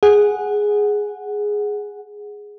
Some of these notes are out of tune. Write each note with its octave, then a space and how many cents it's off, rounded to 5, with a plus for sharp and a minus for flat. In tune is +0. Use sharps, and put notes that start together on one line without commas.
G#4 +0 F#5 +0